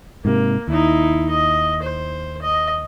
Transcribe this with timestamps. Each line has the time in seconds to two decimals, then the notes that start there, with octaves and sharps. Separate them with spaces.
0.25 G#2 C3 A#3
0.68 D#2 D#4 E4
1.29 D#5
1.82 C5
2.41 D#5